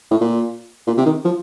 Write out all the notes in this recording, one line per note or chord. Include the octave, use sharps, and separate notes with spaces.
A2
A#2
A#2
C3
D#3
F3